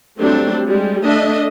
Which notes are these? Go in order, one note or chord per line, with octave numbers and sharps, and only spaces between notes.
F#3 G3 A3 C4 D4
G3 G#3
A3 D4 A4 D#5 E5